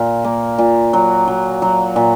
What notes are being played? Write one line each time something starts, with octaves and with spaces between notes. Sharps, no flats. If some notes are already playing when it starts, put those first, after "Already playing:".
Already playing: A#2
A#3
A#2
F#3
F#3
F#3
A#2